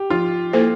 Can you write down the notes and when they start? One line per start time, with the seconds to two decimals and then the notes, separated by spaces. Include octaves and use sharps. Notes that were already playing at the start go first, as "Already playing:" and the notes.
Already playing: G4
0.10 F3 F4
0.53 A#3 E4 A4 C5